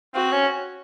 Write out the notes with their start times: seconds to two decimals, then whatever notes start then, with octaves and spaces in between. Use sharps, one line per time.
0.14 C4 F#4
0.32 C#4